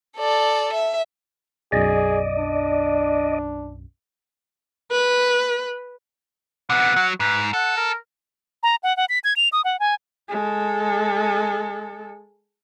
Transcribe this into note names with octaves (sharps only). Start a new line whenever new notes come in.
A4 D5
E5
B1 F#2 G#4 D5 D#5
D4
B4
C3 B3 F#5
F#3
G#2 B4
A4 F#5
A#4
A#5
F#5
F#5
B6
G#6
F7
D#6
F#5
G#5
G#3 A4